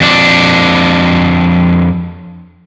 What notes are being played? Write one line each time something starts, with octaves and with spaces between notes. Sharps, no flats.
F2 D4